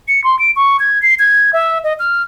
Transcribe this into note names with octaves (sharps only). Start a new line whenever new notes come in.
C#7
C6
D7
C#6
G#6
C7
G#6
E5
D#5
F6